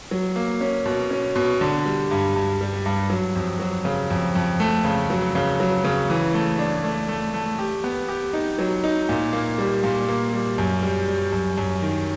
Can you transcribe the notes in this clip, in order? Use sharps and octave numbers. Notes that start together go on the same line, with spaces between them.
F#3
A#3
C#4
B2
C#4
B2
D3
G3
G2
G2
G3
G2
F#3
F2
F#3
C#3
F2
F2
A3
C#3
F#3
C#3
F#3
C#3
E3
A3
D4
A3
A3
A3
G4
B3
G4
D#4
F#3
D#4
A#2
A#3
G3
A#2
A#3
G3
F#2
G3
G3
F#2
F#2
D#3